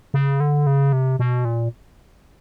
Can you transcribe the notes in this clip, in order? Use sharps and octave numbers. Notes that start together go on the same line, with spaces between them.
C#3
D3
C#3
C3
B2
A#2